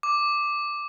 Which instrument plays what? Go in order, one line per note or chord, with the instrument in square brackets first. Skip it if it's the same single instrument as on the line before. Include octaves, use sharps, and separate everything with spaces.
[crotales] D6